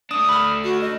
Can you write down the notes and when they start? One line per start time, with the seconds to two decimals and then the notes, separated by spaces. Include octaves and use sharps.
0.11 A3 D4 D#6
0.29 B5 F6
0.64 F#4
0.81 D#5